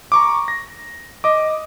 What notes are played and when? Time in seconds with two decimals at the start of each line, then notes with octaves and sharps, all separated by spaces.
0.12 A#5 C#6 D6
0.48 A#6
1.24 D#5 D6